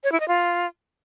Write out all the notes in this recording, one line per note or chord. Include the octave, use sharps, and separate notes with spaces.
C#5
E4
D#5
F4